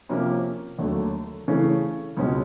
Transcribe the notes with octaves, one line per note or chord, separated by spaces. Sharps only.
C3 F3 A#3 C#4
D#2 D3 F#3 A3
C#3 E3 A3 C#4
C#2 B2 G#3 C#4